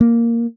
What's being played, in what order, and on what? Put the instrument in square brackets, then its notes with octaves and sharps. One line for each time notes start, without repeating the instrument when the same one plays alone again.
[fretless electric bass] A#3